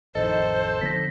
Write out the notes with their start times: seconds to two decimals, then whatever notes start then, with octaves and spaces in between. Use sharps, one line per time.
0.15 A1 F2 D#3 A4 C5 D#5
0.81 D3 F3 B3 A#6 B6